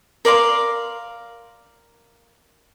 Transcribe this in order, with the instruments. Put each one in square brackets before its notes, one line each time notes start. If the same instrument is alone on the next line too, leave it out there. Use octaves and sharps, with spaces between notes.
[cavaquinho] A#4 D5 F5 C6